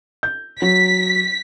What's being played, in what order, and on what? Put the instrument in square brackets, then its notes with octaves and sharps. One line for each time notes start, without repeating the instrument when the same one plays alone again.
[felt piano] G6
[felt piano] F#3 [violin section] B6